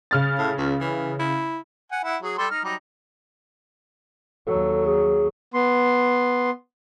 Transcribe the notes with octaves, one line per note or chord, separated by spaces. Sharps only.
C#3 F6 A6
A2
C#2
E3
E4
F#5 G#5
E4 F#5
F#3 G#4
G3 A4 C6
D#4 F6
F#3 G3 D#4
D#2 F#3 A4
G#4
B3 C6